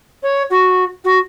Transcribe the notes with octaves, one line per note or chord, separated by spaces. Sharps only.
C#5
F#4
F#4